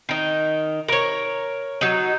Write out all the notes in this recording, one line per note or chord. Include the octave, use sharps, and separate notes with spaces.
D#3 D#4
A#4 C#5
F#3 D#4